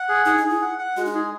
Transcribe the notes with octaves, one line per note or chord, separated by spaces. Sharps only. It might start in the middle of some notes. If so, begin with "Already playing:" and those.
Already playing: F#5
G#4
D#4 G#4
D#4
G#4
E4
F#5
F#5
G#3 F#4
D#4
E4 G#4